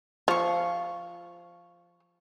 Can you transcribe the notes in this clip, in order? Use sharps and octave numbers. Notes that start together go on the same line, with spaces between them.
F3 F5 C#6